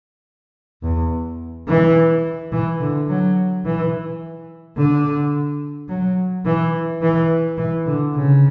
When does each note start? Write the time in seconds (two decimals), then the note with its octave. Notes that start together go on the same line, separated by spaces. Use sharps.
0.83 E2
1.68 E3
2.52 E3
2.81 D3
3.08 F#3
3.65 E3
4.77 D3
5.89 F#3
6.45 E3
7.02 E3
7.58 E3
7.86 D3
8.14 C#3